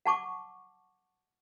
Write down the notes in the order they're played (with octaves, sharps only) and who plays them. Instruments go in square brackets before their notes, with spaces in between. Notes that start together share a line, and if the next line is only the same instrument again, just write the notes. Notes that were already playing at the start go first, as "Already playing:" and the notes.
[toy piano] F#5 A5 C#6 D6